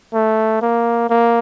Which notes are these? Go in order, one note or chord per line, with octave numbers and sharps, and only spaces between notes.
A3
A#3
A#3